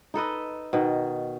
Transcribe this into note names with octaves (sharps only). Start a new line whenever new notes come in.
D#4 A4 B4 D#5
B2 D#3